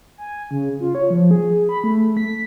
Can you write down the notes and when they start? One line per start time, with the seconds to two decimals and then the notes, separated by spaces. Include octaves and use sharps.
0.18 G#5
0.51 C#3
0.80 F4
0.95 C#5
1.10 F3
1.31 G#4
1.69 B5
1.84 A3
2.17 B6